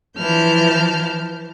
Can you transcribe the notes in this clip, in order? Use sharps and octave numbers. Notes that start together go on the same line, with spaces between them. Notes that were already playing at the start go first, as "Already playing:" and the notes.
E3 F3 A5 F6 G6